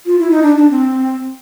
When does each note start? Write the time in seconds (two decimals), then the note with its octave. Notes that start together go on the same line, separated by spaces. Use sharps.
0.06 F4
0.19 E4
0.31 D#4
0.43 D4
0.57 D4
0.71 C4